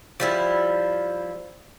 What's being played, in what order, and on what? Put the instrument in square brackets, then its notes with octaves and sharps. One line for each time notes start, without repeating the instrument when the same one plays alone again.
[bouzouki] F3 G3 E4